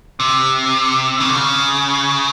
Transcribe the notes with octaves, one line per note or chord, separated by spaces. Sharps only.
C3
C#3
D3
C#3